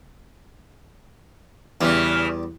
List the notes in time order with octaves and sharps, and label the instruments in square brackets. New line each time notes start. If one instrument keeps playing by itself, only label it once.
[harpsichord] E2 G3 [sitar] C#3 E3